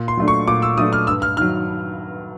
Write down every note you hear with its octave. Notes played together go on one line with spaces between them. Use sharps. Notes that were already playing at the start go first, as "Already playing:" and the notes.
Already playing: A#2
C6
F#3 A3 D4
C#6
A#2 D6
E6
F#3 A3 D4 D#6
F6
G2 E6
F6
D#3 F#3 F6